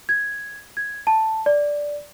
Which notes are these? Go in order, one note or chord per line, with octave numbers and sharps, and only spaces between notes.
G#6
G#6
A5
D5